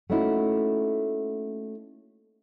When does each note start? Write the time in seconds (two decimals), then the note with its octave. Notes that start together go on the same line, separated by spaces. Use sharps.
0.10 A3 A#3 C#4 D#4 E4 F#4